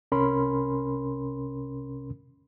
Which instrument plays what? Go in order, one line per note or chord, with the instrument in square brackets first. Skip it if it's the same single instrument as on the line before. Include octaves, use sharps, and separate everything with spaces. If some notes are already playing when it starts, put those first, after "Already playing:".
[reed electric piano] C2 C3 C#4 A#4 B5 C6